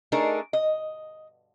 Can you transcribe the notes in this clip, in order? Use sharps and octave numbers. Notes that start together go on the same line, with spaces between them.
A3 D4 D#4 G#4 A#4
D#5